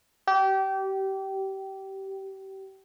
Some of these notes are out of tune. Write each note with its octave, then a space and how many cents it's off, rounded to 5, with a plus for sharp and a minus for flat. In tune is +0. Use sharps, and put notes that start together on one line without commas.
G4 -25